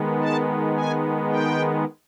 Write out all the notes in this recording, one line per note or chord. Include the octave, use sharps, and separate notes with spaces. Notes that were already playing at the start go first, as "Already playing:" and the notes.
Already playing: D#3 G#3 B3
A5
G#5
G5